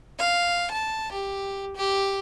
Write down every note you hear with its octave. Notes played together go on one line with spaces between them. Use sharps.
F5
A5
G4
G4